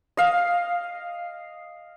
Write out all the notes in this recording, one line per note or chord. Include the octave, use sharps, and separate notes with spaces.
D#5 F5